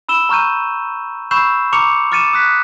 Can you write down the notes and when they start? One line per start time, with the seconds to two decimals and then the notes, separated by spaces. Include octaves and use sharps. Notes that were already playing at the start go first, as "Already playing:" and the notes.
0.09 B5 E6 E7 G7
0.29 A#5 C#6 F6 G6 D#7
1.31 B5 C#6 E6 G6 C7 E7
1.73 A#5 C#6 D6 F6 C#7 F7
2.12 D6 F6 A6 C#7 D#7 E7
2.33 D#6 F#6 B6